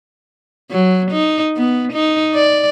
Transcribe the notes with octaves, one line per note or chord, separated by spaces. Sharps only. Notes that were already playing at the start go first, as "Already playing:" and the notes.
F#3
D#4
B3
D#4
D5